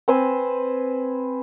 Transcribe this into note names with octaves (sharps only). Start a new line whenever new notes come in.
C4 B4 C5 G#5